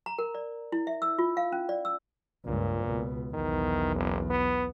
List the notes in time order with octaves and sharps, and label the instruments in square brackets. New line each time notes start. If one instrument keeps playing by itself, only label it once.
[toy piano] A#5
A#4
D5
E4
E5
E6
F4
F5
C#4
D5
E6
[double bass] C#2 G2 [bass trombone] A#2
[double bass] C#2 B2
[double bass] B1 E2 [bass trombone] D#3
[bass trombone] F#1
B3